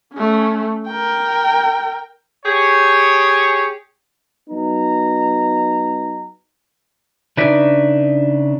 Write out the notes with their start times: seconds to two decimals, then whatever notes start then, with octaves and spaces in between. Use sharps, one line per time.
0.14 A3 C#4
0.88 A#4 G5
2.46 G4 G#4 C#5
4.50 F#3 B3 D#4 A#5
7.37 C#3 D4 D#4 B4 D5 E5